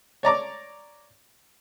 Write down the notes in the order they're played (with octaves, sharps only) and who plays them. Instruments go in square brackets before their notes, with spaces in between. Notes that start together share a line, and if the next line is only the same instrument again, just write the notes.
[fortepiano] C#5 D5 A#5 D6